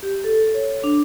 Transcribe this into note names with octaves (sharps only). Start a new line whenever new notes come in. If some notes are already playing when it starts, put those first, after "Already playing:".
G4
A4
C#5
D4